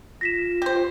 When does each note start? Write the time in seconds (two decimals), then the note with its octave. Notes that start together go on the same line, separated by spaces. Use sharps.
0.21 F4 A#6 B6 E7
0.62 G4 C5